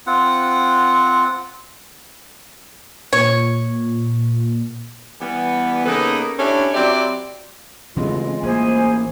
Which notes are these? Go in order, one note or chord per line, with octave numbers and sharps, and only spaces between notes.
C4 F4 F#5
A#2 C#5
E3 G3 B3
C#3 A#3 B3 D#4 A4 B4
C#4 D4 E4 G4 A4 C#5
F#3 C4 E4 G4 D5
A1 C#3 E3 G#3 C4 F4
A1 A#3 G#4 C5 G#5